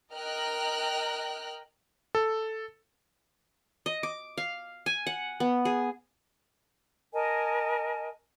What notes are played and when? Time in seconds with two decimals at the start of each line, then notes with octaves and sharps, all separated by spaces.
0.14 A#4 D#5 G5 A#5 F6 F#6
2.15 A4
3.86 D#5
4.03 D6
4.38 F5
4.86 G#5
5.07 F#5
5.40 B3
5.65 G#4
7.13 A#4 D#5 G#5 A5